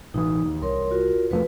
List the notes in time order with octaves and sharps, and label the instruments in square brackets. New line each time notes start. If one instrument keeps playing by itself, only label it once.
[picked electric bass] A1 B2 E3 [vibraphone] D#4 D#6
[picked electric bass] D#2
[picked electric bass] C2 [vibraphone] A#4 C#5 C6
[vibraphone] F4 F#4 A#4
[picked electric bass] E1 F3 A3 [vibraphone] B4